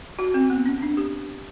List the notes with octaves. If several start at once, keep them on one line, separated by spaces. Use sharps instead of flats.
F#4
C4
B3
C#4
D4
G4